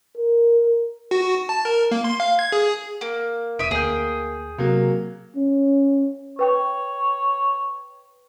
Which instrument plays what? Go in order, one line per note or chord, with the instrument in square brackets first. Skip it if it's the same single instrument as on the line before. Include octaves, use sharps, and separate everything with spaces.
[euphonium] A#4
[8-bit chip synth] F#4
A5
A#4
A#3
C6
F5
G#6
G#4
[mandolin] A#3
[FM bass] E1 [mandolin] E5 D#6 [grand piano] D7 D#7
[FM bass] D2 [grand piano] A#3 [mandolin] G#4 G5
[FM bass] C3 [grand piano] F#3 A#3
[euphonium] C#4
[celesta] B4 G5 C#6 [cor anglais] C#5